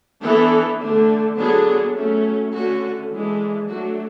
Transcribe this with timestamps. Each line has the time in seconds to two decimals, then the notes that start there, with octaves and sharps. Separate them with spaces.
0.22 E3 B3 D4 A4
0.79 D3 A3 D4
1.38 D3 F#3 B3 D4 G#4
1.95 F#3 A3 C#4
2.53 D3 A3 C#4 F#4
3.11 E3 G#3 D4
3.68 F#3 A3 D4 F#4